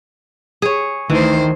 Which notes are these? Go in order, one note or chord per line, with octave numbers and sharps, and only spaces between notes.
G#4 C#5
D2 D#3 E3 C5